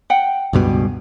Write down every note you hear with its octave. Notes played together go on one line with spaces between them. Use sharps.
F#5 G5
C#2 G2 B2